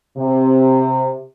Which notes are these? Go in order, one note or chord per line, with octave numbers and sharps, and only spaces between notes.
C3